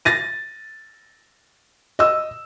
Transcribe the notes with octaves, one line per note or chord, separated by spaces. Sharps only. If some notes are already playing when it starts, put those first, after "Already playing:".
A6 A#6 D#7
D#5 E6